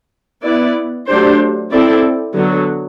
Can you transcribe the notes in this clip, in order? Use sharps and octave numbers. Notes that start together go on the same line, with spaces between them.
B3 E4 B4 D5
F#3 A3 D4 G4 C5
C4 E4 A4 D5
D3 F#3 B3